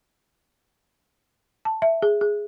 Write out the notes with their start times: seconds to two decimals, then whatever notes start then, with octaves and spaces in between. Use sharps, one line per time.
1.65 A5
1.82 E5
2.02 G#4
2.21 G#4